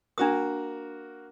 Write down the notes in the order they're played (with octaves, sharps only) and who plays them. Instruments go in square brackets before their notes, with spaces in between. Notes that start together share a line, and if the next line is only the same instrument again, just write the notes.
[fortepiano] A#3 F#4 A#4 [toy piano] D4 D#6